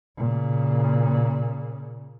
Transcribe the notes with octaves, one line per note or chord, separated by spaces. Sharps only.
A#2 C#3